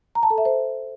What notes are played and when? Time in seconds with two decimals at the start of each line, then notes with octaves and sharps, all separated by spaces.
0.15 A#5
0.23 A5
0.30 A4
0.38 E5
0.45 C5